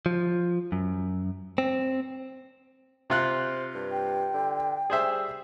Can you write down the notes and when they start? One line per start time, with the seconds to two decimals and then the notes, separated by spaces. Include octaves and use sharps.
0.06 F3
0.72 F#2
1.58 C4
3.10 C3 F4 C5 F#6
3.75 G2
3.92 G5
4.34 D3
4.90 G3 G#4 C5 E5